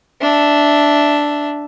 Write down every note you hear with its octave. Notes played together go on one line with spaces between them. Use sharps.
D4 E5